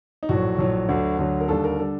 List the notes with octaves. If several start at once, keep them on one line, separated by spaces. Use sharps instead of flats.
D#4
A#1 A2 F#3 F#4
A#1 A2 F#3
D2 D3 F#3
D2 D3 F#3
A#4
D#2 D3 G3 A4
A#4
D3 G3 A4